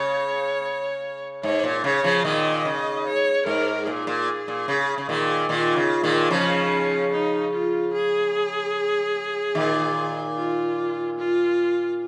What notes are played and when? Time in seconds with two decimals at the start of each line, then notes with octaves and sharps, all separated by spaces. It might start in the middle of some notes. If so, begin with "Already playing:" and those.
Already playing: C#3 C#5
1.43 G#2 C#5
1.64 A#2
1.84 C#3 C#5
2.04 C#3 F3
2.24 A#2 D#3 D#5
2.65 C#3
3.06 C#5
3.46 G#2 A#4
3.87 A#2 G#4
4.07 A#2
4.48 A#2
4.68 C#3
4.98 C#3
5.09 A#2 D#3
5.49 A#2 D#3 F4
5.76 C#3
6.03 A#2 D#3
6.30 C#3 F3 C#4
7.12 D#4
7.53 F4
7.93 G#4
9.55 A#2 D#3
10.36 F4
11.17 F4